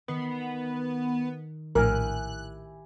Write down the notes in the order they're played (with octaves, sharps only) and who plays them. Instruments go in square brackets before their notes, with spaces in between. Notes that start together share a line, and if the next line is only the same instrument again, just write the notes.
[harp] D#3 C7 [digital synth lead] B3
[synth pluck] A#1 A2 [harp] E4 G4 G#5 [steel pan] A#4 [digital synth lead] F#6